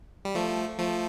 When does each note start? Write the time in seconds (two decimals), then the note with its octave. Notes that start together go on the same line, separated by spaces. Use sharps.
0.25 G3
0.35 F3 A3
0.78 F3 A3